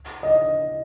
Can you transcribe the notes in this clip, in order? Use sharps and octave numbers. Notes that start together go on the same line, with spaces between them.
D#5